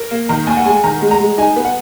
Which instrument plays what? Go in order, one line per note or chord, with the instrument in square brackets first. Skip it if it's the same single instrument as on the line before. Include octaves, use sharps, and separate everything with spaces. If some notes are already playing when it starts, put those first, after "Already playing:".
Already playing: [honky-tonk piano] A#4
A#3
[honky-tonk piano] D#3 [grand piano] A#5
[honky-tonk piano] D#2 [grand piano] G#5
[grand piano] F#5
[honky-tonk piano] G#3 [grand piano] G#5
[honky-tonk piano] D#3 [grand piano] A#5
[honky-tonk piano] G#3
[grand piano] A#5
[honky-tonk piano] G#3
[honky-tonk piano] D#4 [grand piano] G#5
[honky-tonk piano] B3
[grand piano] F#5